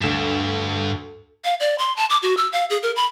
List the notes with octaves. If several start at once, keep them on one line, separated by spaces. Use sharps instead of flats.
D2 G2 E7
F5
D5
C6
A5
D6
F#4
E6
F5
G#4
A#4
B5